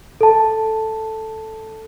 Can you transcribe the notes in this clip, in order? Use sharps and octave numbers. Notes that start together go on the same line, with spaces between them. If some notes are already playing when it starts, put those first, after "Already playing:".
A4 A5